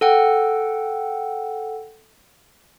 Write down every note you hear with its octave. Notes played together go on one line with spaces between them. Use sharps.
A4 F#5 G5